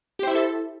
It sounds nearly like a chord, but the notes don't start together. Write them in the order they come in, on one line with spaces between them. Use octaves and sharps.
G4 C5 E4 E5 A4